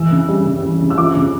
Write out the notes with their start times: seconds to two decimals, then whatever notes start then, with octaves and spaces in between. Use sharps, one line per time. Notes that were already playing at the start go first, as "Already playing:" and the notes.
Already playing: E3 E6
0.11 C#3
0.28 G3
0.46 C#3
0.63 E3
0.81 C#3
0.90 E6
0.97 F3 D6
1.15 C#3